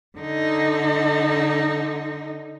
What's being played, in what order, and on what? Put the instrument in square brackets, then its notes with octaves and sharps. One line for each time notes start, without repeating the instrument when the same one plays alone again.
[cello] D3 D#4